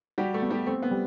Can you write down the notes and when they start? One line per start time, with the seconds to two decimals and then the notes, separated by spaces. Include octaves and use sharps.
0.18 G3 F#4 G4
0.34 A3 A4
0.42 B3
0.50 G3 G4
0.67 A3 C4
0.83 B3
0.91 G3